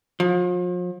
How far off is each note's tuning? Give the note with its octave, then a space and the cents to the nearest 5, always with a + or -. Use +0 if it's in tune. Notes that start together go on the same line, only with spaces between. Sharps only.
F3 +40